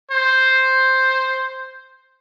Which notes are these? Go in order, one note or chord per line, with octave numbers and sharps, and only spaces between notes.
C5